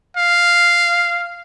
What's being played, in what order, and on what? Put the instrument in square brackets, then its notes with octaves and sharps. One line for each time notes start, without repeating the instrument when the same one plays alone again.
[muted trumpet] F5